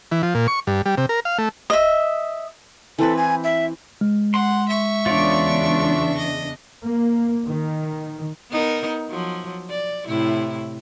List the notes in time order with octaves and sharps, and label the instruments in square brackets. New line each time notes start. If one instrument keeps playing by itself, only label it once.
[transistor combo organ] E3
F3
A#2
C#6
G2
G3
C3
A#4
F5
A3
[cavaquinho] D#5 E5
[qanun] E3 C4 B4 [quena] A4
[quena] G#5
E5
[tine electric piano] G#3
[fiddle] F#5 [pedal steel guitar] C6
[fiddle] E5 C#6
[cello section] E2 C#3 D4 [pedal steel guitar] F4 C#5 D5
[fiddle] D#5
[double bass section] A#3
D#3
[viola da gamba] B3 D#4 A#4
F3 F#3
D5
A2 C3 E4